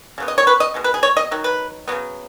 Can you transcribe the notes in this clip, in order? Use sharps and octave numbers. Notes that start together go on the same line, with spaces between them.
C#3 F#3 B3
D#5
C#5
B4
D#5
B2 G#3 B3
B4
G#4
C#5
D#5
D#3 F#3
B4
C#3 F#3 B3